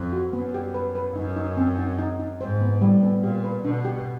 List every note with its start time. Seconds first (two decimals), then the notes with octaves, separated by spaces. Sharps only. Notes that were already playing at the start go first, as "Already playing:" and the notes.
Already playing: F2
0.13 F#4
0.33 F#2 B3
0.54 G4
0.74 B4
0.95 B4
1.15 F#2 D#4
1.36 D#4
1.57 C4
1.78 D#4
1.98 D#4
2.19 D#4
2.41 G#2 C5
2.61 B3
2.81 A2 G3
3.03 B3
3.22 A#2 G4
3.44 B4
3.64 B2 D4
3.85 G4